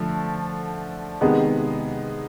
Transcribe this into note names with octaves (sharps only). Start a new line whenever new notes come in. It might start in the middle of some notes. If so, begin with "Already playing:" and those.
Already playing: D3 F3 A3
C3 D#3 G#3 B3